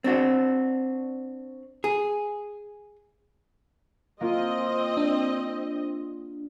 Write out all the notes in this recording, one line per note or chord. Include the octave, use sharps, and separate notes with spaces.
C4 D4 F#4
G#4
A#3 C4 F4 D#5
D4